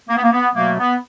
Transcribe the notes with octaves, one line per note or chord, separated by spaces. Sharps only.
A#3
B3
A#3
B3
B2 F#3 A3 A#3
B3